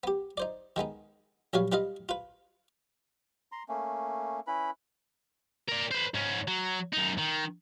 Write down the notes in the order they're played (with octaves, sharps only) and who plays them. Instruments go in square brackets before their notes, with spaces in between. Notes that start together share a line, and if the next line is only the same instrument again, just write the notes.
[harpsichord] B3 G4
D#4 C5 D5
D#3 G#3 B3 D#4
A#1 F#3 G3 B4 C#5 F5
G3 F4 B4 D#5 F5
F4 B4
[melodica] A#5 C6
A3 A#3 C#4
C#4 E4 B4 B5
[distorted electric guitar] A#4 D5
B4 C5
G#2 C#4
F#3
F#2 D#4
D#3